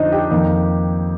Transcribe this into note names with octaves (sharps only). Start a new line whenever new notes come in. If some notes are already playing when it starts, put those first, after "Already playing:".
Already playing: F2 D3 F3 D4 D#4 C5 D#5
G4 G5
F2 D#3 A#3 D#4